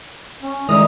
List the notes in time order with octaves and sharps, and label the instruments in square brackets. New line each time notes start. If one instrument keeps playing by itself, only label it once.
[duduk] C#4
[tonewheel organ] D#3 G#3 A#5 [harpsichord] G3 D#6 [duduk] E4